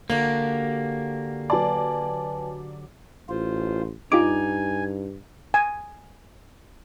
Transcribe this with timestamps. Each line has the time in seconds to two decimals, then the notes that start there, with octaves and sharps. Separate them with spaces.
0.10 D3 A#3 F#4 G4
1.50 F#3 B4 D5 G#5 A5
3.29 A1 F4 C5
4.12 G2 D#4 F4 G4 G#5 D6
5.54 G#5